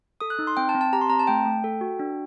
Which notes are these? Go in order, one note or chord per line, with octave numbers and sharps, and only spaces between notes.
A4 D#6
F#6
D#4
C6
C4 G5
A5
C4
A5
G4 A#5
C6
C4 A#5
A5
A3 G5
A3
A4
F#4
D4